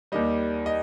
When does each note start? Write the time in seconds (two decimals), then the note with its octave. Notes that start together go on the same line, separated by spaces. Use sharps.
0.12 D#2 D#3 G3 D#5
0.66 D#5